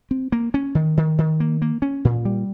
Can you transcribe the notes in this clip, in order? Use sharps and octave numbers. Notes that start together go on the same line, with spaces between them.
C4
A#3
C#4
D#3
D#3
D#3
A#3
A#3
C#4
A#2
G3